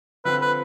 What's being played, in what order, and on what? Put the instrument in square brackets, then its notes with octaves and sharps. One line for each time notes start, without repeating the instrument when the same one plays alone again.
[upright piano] D3 F3 C4 F4 [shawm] B4
[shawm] B4